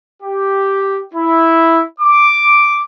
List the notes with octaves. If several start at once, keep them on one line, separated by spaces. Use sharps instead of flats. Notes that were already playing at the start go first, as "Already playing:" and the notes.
G4
E4
D6